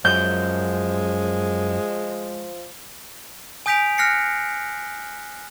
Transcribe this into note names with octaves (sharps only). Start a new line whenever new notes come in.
F#2 F3 G#3 G6
G#5 D#6 G6 B6 D7 F7
F6 F#6 A#6 C7 C#7